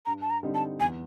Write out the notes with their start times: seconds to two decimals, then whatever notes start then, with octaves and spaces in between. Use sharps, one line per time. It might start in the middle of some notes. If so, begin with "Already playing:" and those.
0.06 G2 A#5
0.22 A5
0.30 A#5
0.43 D3 G3 C4 D#4
0.55 A5
0.79 E2 G#5